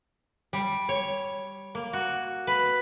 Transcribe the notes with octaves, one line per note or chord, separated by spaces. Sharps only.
G3
C#5
A#3
F#4
B4